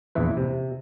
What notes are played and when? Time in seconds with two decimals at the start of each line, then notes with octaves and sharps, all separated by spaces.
0.15 A#1 E2 E3 E4 B4
0.37 C3